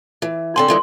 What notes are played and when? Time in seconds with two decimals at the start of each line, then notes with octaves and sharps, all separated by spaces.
0.22 E3
0.56 D3 C4 G#5 C6
0.68 D3 E3 G#3